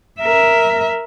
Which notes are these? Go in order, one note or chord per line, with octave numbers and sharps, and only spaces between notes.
A#4 E5